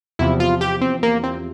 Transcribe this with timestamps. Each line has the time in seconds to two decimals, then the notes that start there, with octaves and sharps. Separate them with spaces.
0.19 E2 C3 F3 E4
0.40 F4
0.61 G4
0.81 C4
1.03 A#3
1.23 C4